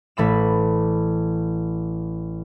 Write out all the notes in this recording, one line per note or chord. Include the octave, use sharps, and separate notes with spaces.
A1 A3 B5 E7